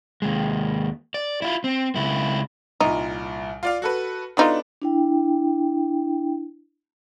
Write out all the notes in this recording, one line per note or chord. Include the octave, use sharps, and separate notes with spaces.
D#2 G#3
D5
E4 F4
C4
C#2 E4
C2 A#2 D#4
F4 D5 F5
F#4 A4 B4
F#3 B3 D4 D#4 F4 A4
D4 E4 G5